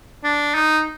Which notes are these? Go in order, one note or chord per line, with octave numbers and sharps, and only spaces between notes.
D4
D#4